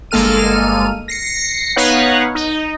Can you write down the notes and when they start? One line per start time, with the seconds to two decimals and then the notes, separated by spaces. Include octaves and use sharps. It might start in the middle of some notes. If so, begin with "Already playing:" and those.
0.11 G1 G#3 A#3 A4 F6 D#7
1.08 A#6 C7 C#7
1.76 B3 D#4 B4 C#5 F5 F#5
2.35 D#4